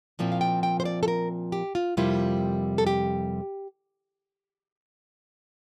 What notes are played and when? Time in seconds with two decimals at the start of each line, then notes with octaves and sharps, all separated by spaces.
0.19 A#2 F3 C4 E4
0.32 F5
0.41 G5
0.63 G5
0.80 C5
0.85 D5
1.03 A4
1.08 A#4
1.52 G4
1.75 F4
1.97 F2 C3 G3 A#3 E4 F4
2.78 A4
2.87 G4